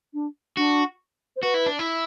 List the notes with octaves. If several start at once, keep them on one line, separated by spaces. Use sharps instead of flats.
D4
D4 F#4
C5
F#4 B4
E4
D4
E4